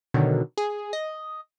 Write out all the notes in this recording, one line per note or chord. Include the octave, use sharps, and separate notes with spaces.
B2 D3 D#3 F#3
G#4
D#5